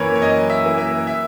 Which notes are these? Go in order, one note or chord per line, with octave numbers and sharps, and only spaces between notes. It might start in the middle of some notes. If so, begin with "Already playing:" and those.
Already playing: F#2 E3 A#3 A#4 B4 C#5
C#5
F#2 D#5
E5
E3 A#3
E5
E5